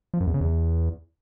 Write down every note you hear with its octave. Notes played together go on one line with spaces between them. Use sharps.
F3
F#2
E2
C#3
E2